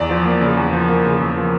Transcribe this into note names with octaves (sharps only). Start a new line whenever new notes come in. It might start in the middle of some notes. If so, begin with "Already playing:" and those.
Already playing: E2 D5
F3
A#3
C#3
E2
F3
A#3
C#3
E2
F3